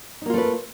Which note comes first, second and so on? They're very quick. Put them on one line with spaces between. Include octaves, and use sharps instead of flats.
D#4 A#3 F4 A3 B4